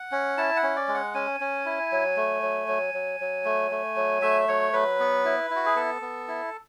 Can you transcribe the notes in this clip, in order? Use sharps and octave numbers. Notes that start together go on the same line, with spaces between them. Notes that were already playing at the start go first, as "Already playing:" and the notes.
Already playing: F#5
C#4
E4 A5
F#5
C#4
D5
G#3
F#5
C#4 G#5
C#4
E4
F#3
A3
F#3
F#3
F#3
F#3
A3
A3
F#3
A3 E5
F#3 C#5
F#3 B4
B3
E4
E4
F#4
G#4
B3 A4
B3
E4